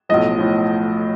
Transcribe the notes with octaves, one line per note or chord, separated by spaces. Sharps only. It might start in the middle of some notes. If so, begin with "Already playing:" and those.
B1 A2 F3 D#5
A2 F3